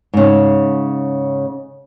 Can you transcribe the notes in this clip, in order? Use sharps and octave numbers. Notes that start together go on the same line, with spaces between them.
G#2 C#3